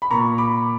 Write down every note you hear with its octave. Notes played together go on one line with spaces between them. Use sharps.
B5
A#2 A#5 C#6
B5 D6